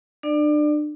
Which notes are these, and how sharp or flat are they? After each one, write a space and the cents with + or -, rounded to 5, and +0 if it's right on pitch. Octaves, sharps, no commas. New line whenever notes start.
D4 +35 D5 +15